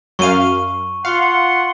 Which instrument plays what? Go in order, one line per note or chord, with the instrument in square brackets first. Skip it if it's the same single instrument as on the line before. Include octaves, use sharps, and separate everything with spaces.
[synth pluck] F#2 F5 [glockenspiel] C#6 D#7
[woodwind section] F4 F#5 C6 [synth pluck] F5